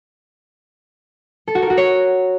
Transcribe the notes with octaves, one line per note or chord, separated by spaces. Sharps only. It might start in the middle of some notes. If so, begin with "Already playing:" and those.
A4
F#4
A#4
F#4
C#5